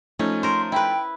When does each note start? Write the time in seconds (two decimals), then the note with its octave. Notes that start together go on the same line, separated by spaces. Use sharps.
0.19 F3 A3 C#4 D#4
0.43 A#4 C5 C6
0.72 E4 B4 G5